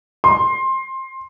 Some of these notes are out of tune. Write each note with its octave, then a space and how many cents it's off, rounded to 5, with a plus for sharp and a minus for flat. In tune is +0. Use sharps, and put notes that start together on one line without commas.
C6 +15